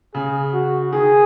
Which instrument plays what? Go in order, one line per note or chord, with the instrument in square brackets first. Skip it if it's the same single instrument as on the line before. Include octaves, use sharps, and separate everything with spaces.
[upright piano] C#3 [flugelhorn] G#4
[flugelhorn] F#4
[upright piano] D#3 [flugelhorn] G#4